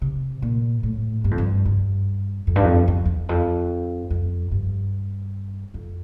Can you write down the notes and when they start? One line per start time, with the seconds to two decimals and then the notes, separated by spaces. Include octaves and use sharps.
0.02 C3
0.42 A#2
0.83 A2
1.24 G2
1.31 F2
1.38 G2
1.65 G2
2.47 F2
2.56 G2
2.64 F2
2.88 E2
3.05 E2
3.29 F2
4.10 F2
4.52 G2
5.74 F2